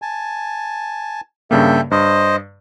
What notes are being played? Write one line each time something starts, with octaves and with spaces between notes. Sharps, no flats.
G#5 A5
G2 C#3 A#3 A4 E5 G5
G2 C5 D#5